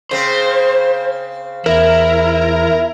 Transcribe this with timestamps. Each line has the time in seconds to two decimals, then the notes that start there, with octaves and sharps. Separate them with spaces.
0.11 C#3 C4 C5
1.66 E2 E4 A#4